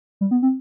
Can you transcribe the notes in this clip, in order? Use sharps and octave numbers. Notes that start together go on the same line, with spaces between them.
G3
B3
C4